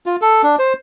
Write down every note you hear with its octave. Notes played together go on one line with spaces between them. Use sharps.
F4
A4
D4
C5